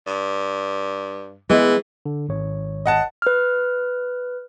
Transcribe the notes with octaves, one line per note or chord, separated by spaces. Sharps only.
G2
E3 G#3 B3
D3
G#1 C#5
D#5 F#5 A5
B4 F6